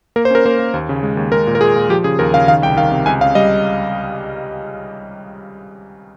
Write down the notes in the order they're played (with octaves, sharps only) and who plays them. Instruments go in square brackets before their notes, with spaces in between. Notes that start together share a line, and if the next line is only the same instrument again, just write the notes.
[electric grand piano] A#3 A#4
C5
C#4 A#4
A#3 C5
A#3
D#2
C#3
G#3
D#2
G#3 A#4
A#2
A#4
A#2 G#4
A#2
F3 G4
C#3 G#4
D#2 A#4
C#3 F5
D#3 F5
C2 G5
D#3 F5
C3
C#2 G#5
C#3 F5
G3 D#5